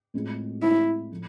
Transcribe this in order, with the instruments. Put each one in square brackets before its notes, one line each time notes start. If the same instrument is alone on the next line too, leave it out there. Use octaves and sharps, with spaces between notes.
[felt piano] A2 G#3 C4 F4 G#4
[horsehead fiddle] E4
[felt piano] A2 F3 A3